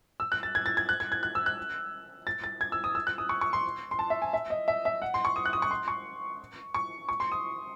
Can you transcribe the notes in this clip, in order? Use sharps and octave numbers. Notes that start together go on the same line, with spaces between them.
E6
F#6
A6
G#6
A6
G#6
F#6
G#6
G#6
F#6
E6
F#6
A6
A6
G#6
E6
D#6
E6
F#6
D#6
C#6
C#6
C6
C6
A5
E5
G#5
E5
D#5
E5
E5
F#5
C6
C#6
D#6
F#6
D#6
C#6
C6
C#6
C#6
C#6
C6
D#6